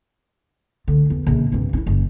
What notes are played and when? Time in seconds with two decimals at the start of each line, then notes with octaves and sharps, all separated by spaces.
0.88 D3 A3
1.10 E2
1.27 A#1 C#3
1.52 C2 G2
1.73 C#4 E4
1.87 F#1